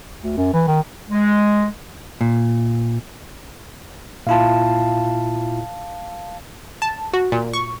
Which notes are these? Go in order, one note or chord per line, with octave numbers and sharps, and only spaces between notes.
D2
F#2
E3
D#3
G#3
A#2
A#2 E4 F4 F5 A5
A5
F#4
A#2
C#6